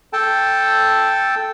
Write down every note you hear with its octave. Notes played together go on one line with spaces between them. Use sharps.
A4 G5 A5